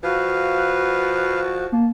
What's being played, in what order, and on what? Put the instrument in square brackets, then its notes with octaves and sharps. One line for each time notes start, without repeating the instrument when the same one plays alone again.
[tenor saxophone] F3 [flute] F#4 [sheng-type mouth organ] B4 F5
[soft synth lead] A#3 [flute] A5